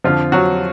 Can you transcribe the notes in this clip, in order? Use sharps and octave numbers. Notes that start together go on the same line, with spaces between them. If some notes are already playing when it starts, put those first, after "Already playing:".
F2 D3 F3 F4
F#3 F#4